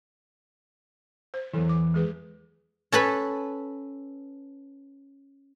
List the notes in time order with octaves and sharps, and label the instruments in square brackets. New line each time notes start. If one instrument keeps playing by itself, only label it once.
[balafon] C5
[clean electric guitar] E2 E3 [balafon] F#3 A4
[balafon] D6
G#3 G#4 B4
[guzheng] C#4 A4 B4 B5